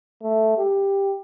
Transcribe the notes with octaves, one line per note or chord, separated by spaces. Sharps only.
A3
G4